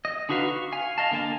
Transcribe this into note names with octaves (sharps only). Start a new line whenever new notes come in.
D#5
D3 D#4 F#4 B4 F5
C#6
F5 G#5
D#5 F5 A5
D3 A#3 A#4 G#5 A5